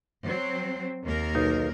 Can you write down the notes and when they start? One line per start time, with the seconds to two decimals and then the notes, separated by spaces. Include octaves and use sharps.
0.23 F#3 C4
1.05 D#2 A#3 A#4
1.35 B1 D#4